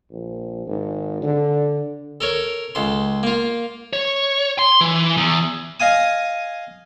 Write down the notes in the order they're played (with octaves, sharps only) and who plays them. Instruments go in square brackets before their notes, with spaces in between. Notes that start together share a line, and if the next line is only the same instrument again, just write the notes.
[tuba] A#1
G#1
D3
[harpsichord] A4 A#4 C#5
C#2 A4 C6
A#3 F4
[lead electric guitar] C#5
C6
E3
E2
[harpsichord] D#5 F5 G#5 D#6